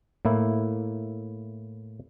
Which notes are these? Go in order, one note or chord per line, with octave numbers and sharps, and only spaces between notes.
A2 A#3 E4